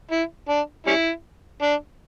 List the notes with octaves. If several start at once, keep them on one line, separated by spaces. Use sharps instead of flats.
E4
D4
G3 C#4 E4
D4